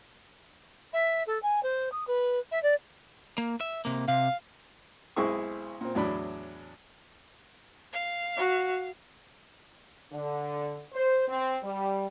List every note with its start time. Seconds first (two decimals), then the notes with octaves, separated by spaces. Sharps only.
0.93 E5
1.27 A4
1.42 G#5
1.63 C5
1.92 D#6
2.07 B4
2.51 E5
2.62 D5
3.38 A#3
3.61 E5
3.85 C3 A#3
4.08 C3 F5
5.16 B1 G#3 C4 E4 G#4 C#6
5.81 A#2 C4
5.95 E2 A2 F#3 D4 B5
7.93 F5
8.37 F#4
10.11 D3
10.92 C5
11.27 C4
11.63 G3